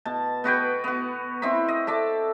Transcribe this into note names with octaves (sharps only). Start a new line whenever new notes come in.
B2 A5
B3 F#4 B4 G5
B3 F#4
C4 E4 D#5 B5
D#5
A4 D5 E5